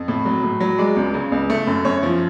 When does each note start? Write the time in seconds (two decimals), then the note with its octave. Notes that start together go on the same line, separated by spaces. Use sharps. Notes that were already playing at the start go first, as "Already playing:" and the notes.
Already playing: F2
0.08 A2
0.25 F#3
0.43 A2
0.60 F#3
0.78 G#3 D5
0.96 C#2
1.14 C#3
1.32 C#2
1.50 A3
1.67 F#2
1.85 F#2 C#5
2.03 F3